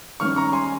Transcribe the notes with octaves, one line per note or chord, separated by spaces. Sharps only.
D#3 G3 C#4 C#6 F6
A#5 C#6
G#5 C6